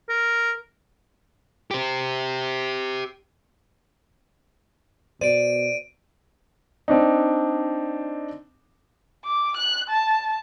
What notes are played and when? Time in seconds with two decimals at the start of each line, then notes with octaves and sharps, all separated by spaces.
0.09 A#4
1.71 G4 C5
5.21 B2 C5 D5 D7 D#7
6.88 C4 D4 D#4
9.25 D6
9.57 F#6
9.90 A5